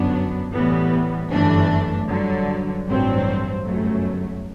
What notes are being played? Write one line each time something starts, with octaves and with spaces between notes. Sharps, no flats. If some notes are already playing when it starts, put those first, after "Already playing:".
Already playing: G1 F#2 F#3 B3 D4
A2 E3 G3 B3
G1 F#2 E3 A3 D4
G2 D3 F#3
A1 G2 F#3 C4
G1 F#2 F#3 A3